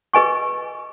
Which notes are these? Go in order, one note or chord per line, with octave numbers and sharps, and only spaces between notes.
G#4 B4 D#5 G#5 C#6